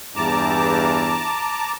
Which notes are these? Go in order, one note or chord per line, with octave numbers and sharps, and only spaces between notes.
E2 G2 A5 A#5 D6